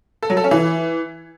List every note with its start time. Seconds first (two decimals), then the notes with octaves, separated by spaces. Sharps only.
0.23 A4
0.30 F#3
0.37 A4
0.44 C#4
0.51 E3